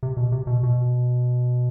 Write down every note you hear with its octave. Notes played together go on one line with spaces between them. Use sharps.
C3
B2
C3
B2
B2